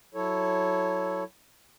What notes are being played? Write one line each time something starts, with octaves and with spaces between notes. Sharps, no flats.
F#3 E4 A4 C#5